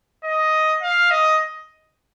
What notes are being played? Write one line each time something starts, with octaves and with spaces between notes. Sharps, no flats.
D#5
F5
D#5